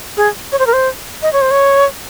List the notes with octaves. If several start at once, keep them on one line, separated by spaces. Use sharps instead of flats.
G#4
C#5
C5
A#4
C5
D#5
C#5
C5
C#5